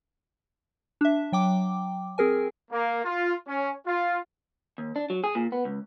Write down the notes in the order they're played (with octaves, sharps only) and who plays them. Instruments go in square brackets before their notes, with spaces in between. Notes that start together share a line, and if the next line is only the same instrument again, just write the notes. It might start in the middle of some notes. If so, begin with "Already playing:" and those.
[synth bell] D4 E5
F#3 G5 D6
C4 G#4 A#4 G#5
[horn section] A#3
F4
C#4
F4
[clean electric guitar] D#2
D4
F#3
G#4
A#2
B3
C#2